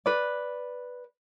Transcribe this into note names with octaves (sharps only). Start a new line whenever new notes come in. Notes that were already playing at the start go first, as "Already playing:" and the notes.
B4 D5